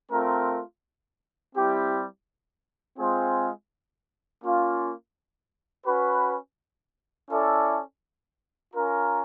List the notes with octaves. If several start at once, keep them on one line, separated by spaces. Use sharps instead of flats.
A3 C4 F4 A#4
G3 C4 E4 G4
G#3 C4 F4 G#4 C5
A#3 C#4 F4
C#4 F#4 B4
C#4 E4 A4 D5
C#4 F4 A#4